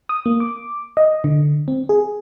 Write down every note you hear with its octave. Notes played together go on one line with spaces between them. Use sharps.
D#6
A#3
D6
D#5
D3
C4
G#4